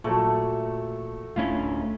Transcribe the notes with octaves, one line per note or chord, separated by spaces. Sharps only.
A#2 F#3 A3 A4 C#6
D1 A3 C#4 D4 E4 F4